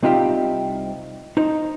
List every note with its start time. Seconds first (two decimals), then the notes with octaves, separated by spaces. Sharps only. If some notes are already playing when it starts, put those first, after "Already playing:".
0.03 C2 C4 D#4 F4 G4 E5
1.37 D#4 C5